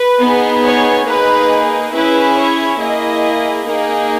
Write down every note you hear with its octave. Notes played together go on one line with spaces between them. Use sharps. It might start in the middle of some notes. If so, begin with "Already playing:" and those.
Already playing: B4
B3 D#4 G#4
C#5
A#3 D#4 G#4 B4
C#4 E4 G#4 B4
C#5
A#3 E4 G#4 D#5
A#3 D#4 G#4